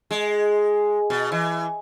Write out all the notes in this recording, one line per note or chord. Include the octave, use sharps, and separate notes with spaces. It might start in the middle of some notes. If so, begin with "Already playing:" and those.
G#3
B2
E3